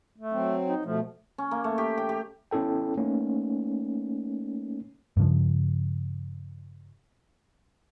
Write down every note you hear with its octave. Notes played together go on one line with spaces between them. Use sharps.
A3
F#3 C4
D#4
B2 F3 A3
C#4
A#3
A3
G4
G5
G4
B3 C#4 E4 A4 G5
A3 A#3 C#4 D#4
G2 C#3 F3